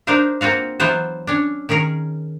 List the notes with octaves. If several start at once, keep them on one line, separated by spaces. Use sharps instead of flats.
D4 D#4 A#4 C5 F5
A#3 C4 F4 F#4 F5
E3 F#3 B3 F4 C5 A5
C#4 D4
D#3 C#4 G#4 A#4